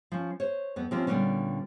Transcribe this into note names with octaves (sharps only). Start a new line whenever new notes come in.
F3 C#4
C5 C#5
F2 B3
C3 F3 A#3 C#4
A#2 D3 G3 A3 B3 C#4